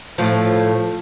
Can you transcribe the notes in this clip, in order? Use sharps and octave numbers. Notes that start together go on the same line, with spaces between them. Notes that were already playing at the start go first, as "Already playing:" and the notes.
A2 F3